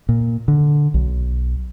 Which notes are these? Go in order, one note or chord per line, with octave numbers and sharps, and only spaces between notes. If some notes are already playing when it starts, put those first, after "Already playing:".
A#2
D3
B1